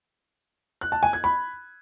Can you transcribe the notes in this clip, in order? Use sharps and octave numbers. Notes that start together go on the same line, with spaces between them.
F#6
A5
G#5
G#6
B5